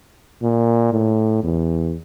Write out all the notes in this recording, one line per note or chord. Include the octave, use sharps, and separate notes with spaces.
A#2
A2
E2